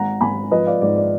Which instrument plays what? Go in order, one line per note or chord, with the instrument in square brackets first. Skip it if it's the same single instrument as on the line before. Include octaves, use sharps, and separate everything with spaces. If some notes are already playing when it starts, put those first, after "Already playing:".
Already playing: [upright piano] G#1 F#5 A#5
G#1 G#5 B5
F3 B4 D#5
D5 F5
G#2 D5
D5